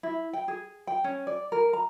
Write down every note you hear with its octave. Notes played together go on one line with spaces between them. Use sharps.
E4
G5
G#4
G5
C#4
D5
A#4
A#5